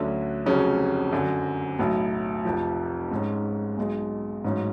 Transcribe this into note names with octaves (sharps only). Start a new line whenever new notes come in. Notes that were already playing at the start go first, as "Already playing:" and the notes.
Already playing: D2 D3 F#3 C#4
F1 F2 C#3 F#3 C#4
F#2 D3 F#3
B1 A2 F#3 B3
F1 F2 F3
G#2 G#3 C#4
B1 B2 G#3
A1 G#2 F#3 C#4